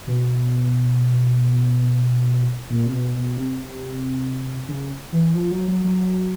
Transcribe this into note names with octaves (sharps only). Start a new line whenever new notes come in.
B2
A#2
C3
B2
B2
C3
C#3
E3
F3
F#3
F#3
F#3